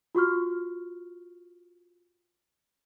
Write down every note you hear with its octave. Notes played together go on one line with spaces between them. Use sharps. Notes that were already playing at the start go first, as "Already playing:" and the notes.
F4 F#4 C#6 F6